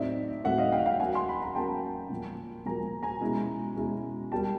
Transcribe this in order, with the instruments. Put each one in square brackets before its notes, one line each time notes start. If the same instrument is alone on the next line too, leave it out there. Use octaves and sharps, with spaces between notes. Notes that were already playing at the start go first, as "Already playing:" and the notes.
Already playing: [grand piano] A2 F#3 A3 C4 D#4 D5 E5
A2 F#3 A3 C4 D#4 E5 F#5
D#5 F5
F5 G5
F5 G5
F#3 A#3 C#4 F#5 G#5
C6
B5
A#5
F#3 A#3 C#4 G5 A5
A#2 F3 A#3
A#2 F3 A#3 G#5 A#5
G#5 A#5
B2 G#3 C#4 E4
B2 G#3 C#4 E4
B2 G3 A#3 G5 A5